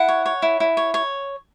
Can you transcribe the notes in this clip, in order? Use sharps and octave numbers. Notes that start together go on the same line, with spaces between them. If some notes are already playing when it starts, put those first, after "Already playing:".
Already playing: E4 F#5
C#5
C#5
E4
E4
C#5
C#5